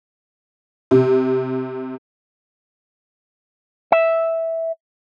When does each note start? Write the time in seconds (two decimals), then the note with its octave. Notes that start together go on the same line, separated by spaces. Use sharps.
0.91 C3
3.92 E5